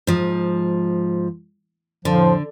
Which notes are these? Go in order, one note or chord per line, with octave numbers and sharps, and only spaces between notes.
G#2 F3
F2 A2 D3 F3